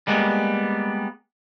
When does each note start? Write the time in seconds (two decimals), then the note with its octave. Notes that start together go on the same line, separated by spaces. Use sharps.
0.07 G3 G#3 A#3 B3